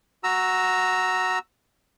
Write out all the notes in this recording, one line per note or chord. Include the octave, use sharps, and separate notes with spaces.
F#4 A#5 E6